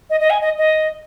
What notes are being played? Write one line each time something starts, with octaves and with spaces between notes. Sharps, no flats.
D#5
D#5
G#5
D#5
D#5